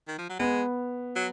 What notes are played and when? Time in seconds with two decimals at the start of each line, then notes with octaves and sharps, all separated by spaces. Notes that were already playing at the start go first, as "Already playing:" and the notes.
0.08 D#3
0.18 F3
0.29 F#3
0.40 G#3 B3
1.16 F#3